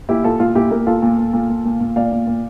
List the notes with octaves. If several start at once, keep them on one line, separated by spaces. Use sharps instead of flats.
A#2 E4 G4
A#2 F4 A4
A#2 F4
A#2 E4 G4
A#2 G4 A#4
A#2 F4 A4
A#2
A#2
A#2
A#2
A#2
A#2
A#2 D5 F5
A#2
A#2